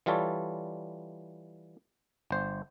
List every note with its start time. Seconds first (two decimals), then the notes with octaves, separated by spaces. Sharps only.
0.06 E3 G3 F4 A4 C#5
2.31 G1 C5